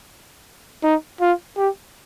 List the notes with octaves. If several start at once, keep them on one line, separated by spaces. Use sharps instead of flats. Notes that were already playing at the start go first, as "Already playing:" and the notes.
D#4
F4
G4